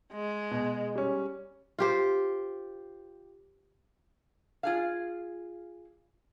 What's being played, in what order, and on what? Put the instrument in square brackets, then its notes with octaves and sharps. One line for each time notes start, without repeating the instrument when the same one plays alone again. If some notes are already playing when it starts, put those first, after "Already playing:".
[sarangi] G#3
[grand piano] B2
G3 C#4
[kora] F4 G4 C5
[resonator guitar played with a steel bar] F4 G#4 F5